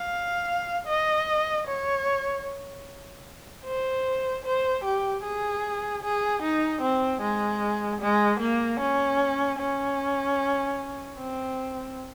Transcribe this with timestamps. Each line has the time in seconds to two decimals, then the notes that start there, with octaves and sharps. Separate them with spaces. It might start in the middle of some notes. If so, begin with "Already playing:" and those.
Already playing: F5
0.87 D#5
1.68 C#5
3.65 C5
4.45 C5
4.85 G4
5.24 G#4
6.03 G#4
6.43 D#4
6.82 C4
7.22 G#3
8.01 G#3
8.40 A#3
8.80 C#4
9.59 C#4
11.19 C4